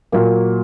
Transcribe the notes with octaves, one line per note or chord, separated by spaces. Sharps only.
A#2 F#3 A#3